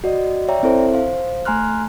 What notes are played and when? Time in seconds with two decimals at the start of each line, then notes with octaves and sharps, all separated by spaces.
0.04 F#4 D5 D#5
0.48 C#5 D5 E5 G5 A#5
0.63 C4 E4 A4 C5 E5
0.94 C5 F5
1.45 A3 G#5 A#5 C6 F6 F#6